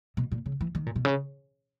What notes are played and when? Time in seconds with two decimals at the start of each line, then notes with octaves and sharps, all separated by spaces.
0.17 B2
0.32 A#2
0.46 C#3
0.61 E3
0.75 D#3
0.86 A#2
0.96 B2
1.05 C#3